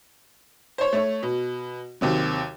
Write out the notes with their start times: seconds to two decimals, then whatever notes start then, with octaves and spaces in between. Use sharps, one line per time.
0.78 C5 C#5
0.93 A3 C#5
1.23 B2
2.01 D#2 C3 F#3